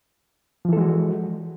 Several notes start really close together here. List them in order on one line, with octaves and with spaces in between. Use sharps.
F3 E3 A4 G#3 F#4